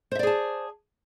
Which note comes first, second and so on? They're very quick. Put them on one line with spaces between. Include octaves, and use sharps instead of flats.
C5 E5 D5 G#4 A5